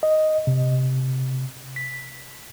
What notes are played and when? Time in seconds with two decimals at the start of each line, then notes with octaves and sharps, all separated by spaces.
0.03 D#5
0.47 C3
1.76 B6